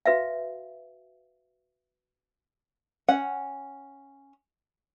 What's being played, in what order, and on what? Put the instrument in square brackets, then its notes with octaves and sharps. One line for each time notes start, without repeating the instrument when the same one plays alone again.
[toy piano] F#4 B4 E5 F5
[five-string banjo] C#4 F#5